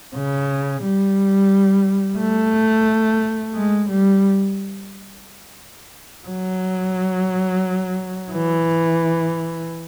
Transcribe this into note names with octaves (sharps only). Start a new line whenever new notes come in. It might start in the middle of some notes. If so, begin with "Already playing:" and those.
C#3
G3
A3
G#3
G3
F#3
E3